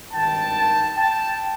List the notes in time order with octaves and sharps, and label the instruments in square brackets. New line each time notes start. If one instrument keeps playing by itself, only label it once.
[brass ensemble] G#1 G2 D#3 G5 A5
G5 A5